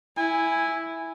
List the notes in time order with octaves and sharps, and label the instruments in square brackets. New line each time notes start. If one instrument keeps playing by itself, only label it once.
[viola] E4 [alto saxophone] G#5